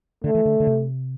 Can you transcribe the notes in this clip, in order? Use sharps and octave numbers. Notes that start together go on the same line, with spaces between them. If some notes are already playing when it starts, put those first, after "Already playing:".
D3 A3
E3
D3
D3
C3